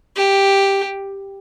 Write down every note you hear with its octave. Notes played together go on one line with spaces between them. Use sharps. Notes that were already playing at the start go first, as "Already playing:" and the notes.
G4